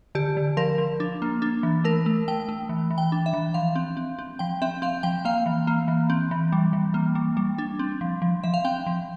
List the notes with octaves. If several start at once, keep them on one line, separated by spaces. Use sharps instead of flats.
D3 G4
D3
F3 A#4
F3
D4
A#3
D4
E3
A3 A#4
A3
A3 G5
A3
E3
E3
G5
D4
E5
E3
F3 F5
C4
C4
C4
F3 G5
C4 E5
C4 F5
F3 G5
A#3 F5
E3
A#3
E3
C4
E3
G3
E3
A#3
G3
G3
D4
C4
F3
F3
F3 E5
F5
C4 G5
F3